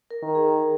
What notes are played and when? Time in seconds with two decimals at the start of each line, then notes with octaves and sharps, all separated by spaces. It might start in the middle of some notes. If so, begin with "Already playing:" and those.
0.11 A#4
0.23 D#3
0.35 G#4